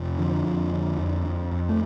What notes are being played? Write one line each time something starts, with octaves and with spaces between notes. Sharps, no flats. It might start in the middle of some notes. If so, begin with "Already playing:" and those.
Already playing: F2 C3
D3 F3
F2
D3
F2
F2
F2
A3